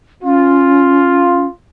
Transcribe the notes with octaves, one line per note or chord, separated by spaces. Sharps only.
C#4 F4